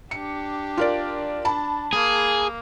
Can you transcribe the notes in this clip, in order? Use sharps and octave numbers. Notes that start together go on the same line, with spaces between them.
D4 G4 C#7
F4 A#4 D5
D4 A5 B5
A#3 G#4